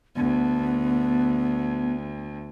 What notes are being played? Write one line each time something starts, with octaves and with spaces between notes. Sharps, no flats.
D2 B3